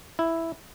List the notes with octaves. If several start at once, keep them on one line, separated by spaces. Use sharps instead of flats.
E4